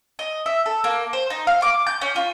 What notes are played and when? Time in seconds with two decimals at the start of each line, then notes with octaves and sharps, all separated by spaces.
0.19 D#5
0.46 E5
0.66 A4
0.84 A#3
1.13 C5
1.30 D#4
1.47 F5
1.62 D6
1.87 G6
2.01 C#4
2.16 F4